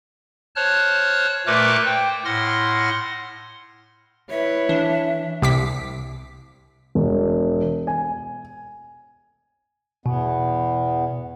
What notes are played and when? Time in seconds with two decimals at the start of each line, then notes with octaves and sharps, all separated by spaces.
0.56 C5 C#5 A5 F6 F#6
1.47 A#2 A3 A#4 B4 D6 F#6
1.85 C5 G5
2.25 A2 F#5 C6 F6 A#6
4.30 E4 B4 C#5 E5
4.69 E3 D4
5.42 C2 D6 B6
6.95 E1
7.87 G#5
10.06 E2 B2 B3